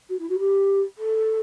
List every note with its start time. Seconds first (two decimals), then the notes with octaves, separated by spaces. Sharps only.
0.09 F#4
0.19 E4
0.29 F#4
0.39 G4
0.97 A4